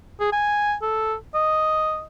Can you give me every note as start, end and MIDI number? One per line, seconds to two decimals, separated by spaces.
0.20 0.29 68
0.32 0.74 80
0.82 1.15 69
1.34 2.04 75